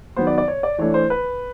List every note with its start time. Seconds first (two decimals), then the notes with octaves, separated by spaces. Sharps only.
0.16 D#3 F#3 B3 C5
0.27 D5
0.38 D5
0.48 C#5
0.63 D5
0.78 E3 A3 D4 C#5
0.94 C5
1.10 B4